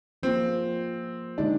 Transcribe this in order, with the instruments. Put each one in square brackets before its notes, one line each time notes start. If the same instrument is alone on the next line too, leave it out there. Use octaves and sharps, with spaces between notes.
[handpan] F3 A#3 F4 G#4 [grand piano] C4
[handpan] D3 G#3 C4 D#4 G4 [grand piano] D4